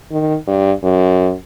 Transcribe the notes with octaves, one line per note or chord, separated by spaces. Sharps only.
D#3
G2
F#2